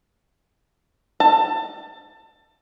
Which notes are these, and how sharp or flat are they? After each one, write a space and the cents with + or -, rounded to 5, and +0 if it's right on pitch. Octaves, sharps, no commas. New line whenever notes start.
A5 +20